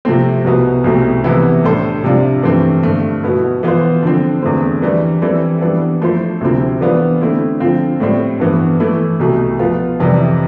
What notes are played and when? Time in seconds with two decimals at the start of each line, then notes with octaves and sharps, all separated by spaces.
0.05 C3 F3 A3 C4
0.44 C2 B2 B3
0.84 C2 B2 A3 C4
1.24 C3 E3 B3 E4 A4
1.63 A2 G3 D4 A4 C5
2.04 C3 G3 D4 F4
2.43 G2 E3 A3 C4
2.83 G2 D3 A3
3.23 B2 B3 E4
3.63 E3 B3 F4 C5
4.03 D3 F3 C4
4.42 E2 D3 A3 C4
4.82 E3 G3 D4
5.22 E3 G3 C4 E4 A4
5.61 E3 G3 B3 D4 A4
6.01 F3 A3 E4 A4 C5
6.41 D2 C3 F3 C4 E4
6.81 E3 G3 B3 D4 F4
7.21 D3 A3 C4 E4
7.60 D3 F3 C4 F4
8.00 A2 G3 C4
8.40 G2 E3 B3
8.80 E3 A3 E4
9.20 C2 B2 A3
9.59 F3 B3 F4
10.00 F2 C3 E3 G3